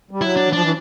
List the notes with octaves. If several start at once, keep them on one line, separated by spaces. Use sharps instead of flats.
G3
F#3 E4
D4
E3
F3 D4
E3